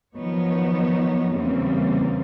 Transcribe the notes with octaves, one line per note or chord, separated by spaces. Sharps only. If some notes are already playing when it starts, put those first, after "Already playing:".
D#3 F3 F#3 B3 D#4 C#5
E2 C#3 E3 G3 A#3 C4